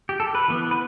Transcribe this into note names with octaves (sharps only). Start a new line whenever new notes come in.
G4
A4
B4
E3 B3
B4